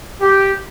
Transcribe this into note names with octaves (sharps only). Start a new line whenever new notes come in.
G4